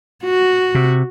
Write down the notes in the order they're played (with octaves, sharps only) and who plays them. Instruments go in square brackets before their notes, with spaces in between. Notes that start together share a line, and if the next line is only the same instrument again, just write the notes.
[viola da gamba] F#4
[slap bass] C3